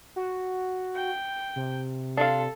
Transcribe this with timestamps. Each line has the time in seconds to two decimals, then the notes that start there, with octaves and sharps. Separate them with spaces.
0.16 F#4
0.95 G5
1.56 C3
2.17 D4 F4 A4 F5